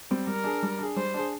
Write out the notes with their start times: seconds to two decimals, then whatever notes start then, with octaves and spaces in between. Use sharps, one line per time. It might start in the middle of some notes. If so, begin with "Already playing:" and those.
0.11 G3 C4
0.27 G3 A#4
0.44 D4 G#4
0.63 G3
0.79 D4 G#4
0.96 G3 C5
1.14 D4 G#4